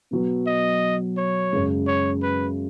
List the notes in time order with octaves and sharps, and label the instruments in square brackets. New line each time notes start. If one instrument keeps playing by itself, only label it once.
[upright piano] B2 F#3 B3
[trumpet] D#5
C#5
[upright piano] F#2 C#3 G#3
[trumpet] C#5
B4